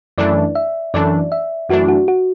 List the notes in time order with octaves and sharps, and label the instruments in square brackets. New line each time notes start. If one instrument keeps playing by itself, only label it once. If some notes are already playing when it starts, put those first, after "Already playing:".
[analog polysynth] F#2 E3 A3 D4 [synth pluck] D5
[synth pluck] E5
[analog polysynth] F#2 E3 A3 D4 [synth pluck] D5
[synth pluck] E5
[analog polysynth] F#2 E3 A3 D4 [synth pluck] F#4
[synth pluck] F#4
F#4